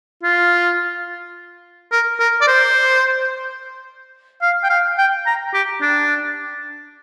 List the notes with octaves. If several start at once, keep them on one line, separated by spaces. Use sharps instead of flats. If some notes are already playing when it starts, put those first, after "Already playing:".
F4
A#4
A#4
D5
C5
F5
G5
F5
G5
A#5
G4
D4